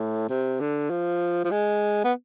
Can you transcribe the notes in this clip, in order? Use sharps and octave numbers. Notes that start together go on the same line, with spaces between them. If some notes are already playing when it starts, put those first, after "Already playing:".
Already playing: A2
C3
D3
F3
F3
G#3
B3